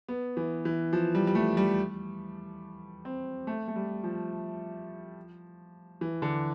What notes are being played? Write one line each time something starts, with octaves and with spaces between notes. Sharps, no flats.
B3
E3
E3
F3
G3
G3
A3
G3
C4
A3
A3
G3
F3
E3
D3